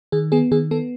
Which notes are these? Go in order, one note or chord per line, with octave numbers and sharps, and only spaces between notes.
D#3 G#4
B3 G#4
D#3 G#4
B3 A4